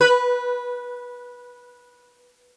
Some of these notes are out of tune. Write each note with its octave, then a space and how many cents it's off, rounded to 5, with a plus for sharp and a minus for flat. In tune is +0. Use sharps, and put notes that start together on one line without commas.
B4 -15